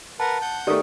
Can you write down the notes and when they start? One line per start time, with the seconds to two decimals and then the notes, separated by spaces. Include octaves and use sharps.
0.20 A#4 B4 F#5 A5
0.41 F#5 G6
0.67 D#3 A3 G4 D5 D#6